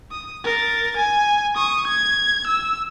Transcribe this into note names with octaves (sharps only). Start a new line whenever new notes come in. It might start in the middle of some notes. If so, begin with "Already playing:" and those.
D#6
A#4 A6
G#5
C#6 D#6
G#6
E6